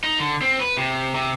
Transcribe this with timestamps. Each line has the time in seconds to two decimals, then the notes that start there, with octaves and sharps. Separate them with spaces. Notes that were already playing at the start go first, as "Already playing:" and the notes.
0.03 D#4
0.20 D3
0.41 C4
0.60 B4
0.78 C3
1.15 C3